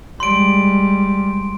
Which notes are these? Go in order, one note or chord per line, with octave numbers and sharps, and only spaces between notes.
G3 G#3 C6 D7